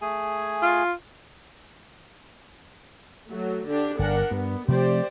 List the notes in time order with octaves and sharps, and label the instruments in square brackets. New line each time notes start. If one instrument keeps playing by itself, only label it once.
[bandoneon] A3 G#4 G#5
[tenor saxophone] F4
[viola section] F#3 A3
D3 D4 G4
[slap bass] G1 [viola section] D4 A#4 F#5
[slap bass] G2 [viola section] B3
[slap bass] C3 F3 A3 [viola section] G4 C5 D5